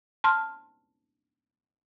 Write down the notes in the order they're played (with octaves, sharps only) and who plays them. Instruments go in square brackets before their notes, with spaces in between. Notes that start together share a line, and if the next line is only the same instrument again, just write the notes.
[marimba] A5 C6 F6